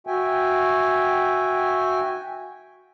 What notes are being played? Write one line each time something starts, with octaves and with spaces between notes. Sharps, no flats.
F#4 E5 G5 G#5